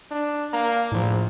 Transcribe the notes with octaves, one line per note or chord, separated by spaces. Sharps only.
D4
A#3 A#5
A#1 A2 F3